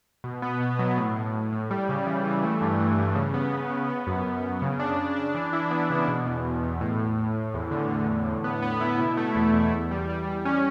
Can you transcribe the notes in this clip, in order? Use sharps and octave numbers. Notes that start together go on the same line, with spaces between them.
B2
B3
B2
F#3
A2
A2
A2
A2
G3
C#3
E3
E3
A3
G2
E3
G2
C#3
B3
B3
C#3
B3
F#2
F#2
F#2
C#3
D4
C#3
D4
E3
E4
B3
C#3
B2
E2
E2
E2
A2
A2
A2
A2
E2
D3
E2
D3
A2
B3
B3
E4
B2
A3
E2
E2
E2
G3
G3
G3
C#4